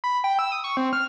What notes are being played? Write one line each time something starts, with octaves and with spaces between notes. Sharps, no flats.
B5
G5
E6
D#6
C#6
C4
F6